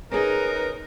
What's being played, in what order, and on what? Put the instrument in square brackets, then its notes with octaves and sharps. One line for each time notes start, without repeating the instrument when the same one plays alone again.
[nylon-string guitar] C#4 G#4 [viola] D#4 [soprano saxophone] A#4 [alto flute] B4